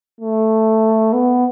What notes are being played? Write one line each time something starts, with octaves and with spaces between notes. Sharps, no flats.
A3
B3